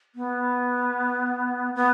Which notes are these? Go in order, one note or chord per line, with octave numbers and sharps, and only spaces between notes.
B3
B3